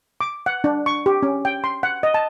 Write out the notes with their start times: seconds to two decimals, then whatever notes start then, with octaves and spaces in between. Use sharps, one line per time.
0.21 D6
0.46 F#5
0.64 D4
0.86 C#6
1.06 G4
1.23 C#4
1.45 G5
1.64 C6
1.83 F#5
2.03 D#5
2.14 A5